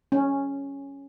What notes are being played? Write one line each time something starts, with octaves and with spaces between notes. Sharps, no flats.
C#4